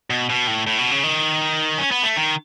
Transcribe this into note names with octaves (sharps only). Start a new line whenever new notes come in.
B2
B2
A2
A2
B2
C#3
D#3
C#4
B3
A3
D#3